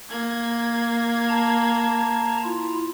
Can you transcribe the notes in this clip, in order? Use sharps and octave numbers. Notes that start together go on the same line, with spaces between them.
A#3 G#6
A5 A#5
E4 F4